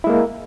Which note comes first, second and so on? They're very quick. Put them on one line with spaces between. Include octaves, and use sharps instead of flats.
E4 G#3 A#3